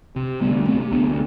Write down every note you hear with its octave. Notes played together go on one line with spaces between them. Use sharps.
C3
D2 G3 B3
C3 A3 C4
D2 B3 D4